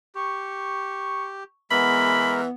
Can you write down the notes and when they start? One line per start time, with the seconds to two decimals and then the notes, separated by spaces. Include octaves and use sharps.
0.15 G4 C#6
1.71 E3 G#3 B3 A#4 B5